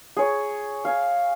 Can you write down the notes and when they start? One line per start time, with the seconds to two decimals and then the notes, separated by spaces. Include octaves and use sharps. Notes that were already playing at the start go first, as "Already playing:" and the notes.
0.17 G#4 C#5
0.85 F5 G#5